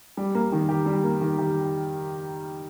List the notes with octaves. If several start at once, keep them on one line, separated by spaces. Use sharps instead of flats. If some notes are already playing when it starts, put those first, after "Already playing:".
G3
A#3
D#3
G4
G3
A#3
D#3
G4